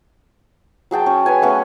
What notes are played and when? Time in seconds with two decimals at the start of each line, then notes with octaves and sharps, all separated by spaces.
0.91 F#3 G#4 G5 A5
1.06 C#4
1.26 B4 C#5 G#5
1.42 A3 B3 C#4